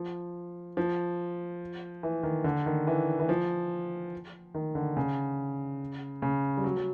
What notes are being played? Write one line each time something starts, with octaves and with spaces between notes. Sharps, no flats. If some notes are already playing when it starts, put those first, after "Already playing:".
Already playing: F3
F3
E3
D#3
D3
D#3
E3
E3
F3
D#3
D3
C#3
C#3
G3
F#3
F#3